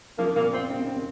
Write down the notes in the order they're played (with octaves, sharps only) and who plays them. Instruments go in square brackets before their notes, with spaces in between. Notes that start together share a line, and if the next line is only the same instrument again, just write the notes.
[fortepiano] F3 [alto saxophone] A#3
[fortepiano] A#2 [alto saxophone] A#3
[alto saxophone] C4 [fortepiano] F4
[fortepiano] C4
C4